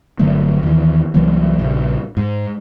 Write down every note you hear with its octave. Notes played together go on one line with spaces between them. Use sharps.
G1 D3 F#3 A3
D#2 E3
C2 E3 F#3 A#3
A#1 C#3
G#2